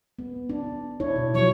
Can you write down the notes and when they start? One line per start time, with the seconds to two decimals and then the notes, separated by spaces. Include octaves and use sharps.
0.19 B3
0.49 D4
1.00 D4 E4 C#5
1.16 B2
1.34 F3 F#3 C#5